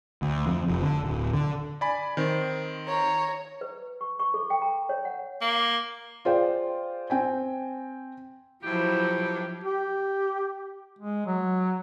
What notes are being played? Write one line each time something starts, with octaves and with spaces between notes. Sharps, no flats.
D2
F2
F1
D3
D1
D3
D5 G#5 B5
D#3 C4
C#5 A#5
B4
C#6
C#6
A4
G5
A#5
C#5
F#5
A#3
F4 G#4 C5 D5 G5
C4 G5 G#5
G2 F3 F#3 E4 G4
G4
G#3
F#3